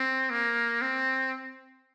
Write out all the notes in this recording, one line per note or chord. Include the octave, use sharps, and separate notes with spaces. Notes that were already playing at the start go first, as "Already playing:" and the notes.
Already playing: C4
A#3
C4